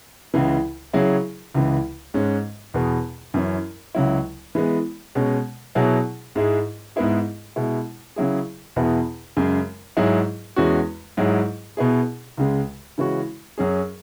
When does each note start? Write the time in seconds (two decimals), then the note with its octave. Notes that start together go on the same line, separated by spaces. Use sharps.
0.34 C#2 C#3 E3
0.93 C#3 F#3 E4 G#4
1.54 C#2 C#3 E3
2.14 G#2 G#3 C#4
2.74 E2 B2 B3 G#4
3.34 F#2 E3 C#4
3.95 C#2 C#3 F#3 E4
4.55 E3 G#3 B3
5.15 B2 G#3 C#4
5.75 B2 F#3 E4 G#4
6.36 G#2 G#3 E4 G#4
6.96 G#2 G#3 B3 E4 G#4
7.56 B2 G#3 E4
8.16 C#3 F#3 E4 G#4
8.76 E2 B2 B3 E4 G#4
9.37 F#2 C#3 G#3
9.97 G#2 F#3 E4 G#4
10.56 E2 E3 G#3 C#4 F#4
11.17 G#2 F#3 E4 G#4
11.77 B2 B3 E4 G#4
12.37 C#2 C#3 G#3
12.98 C#3 E3 G#3 C#4 F#4
13.58 F#2 F#3 C#4 G#4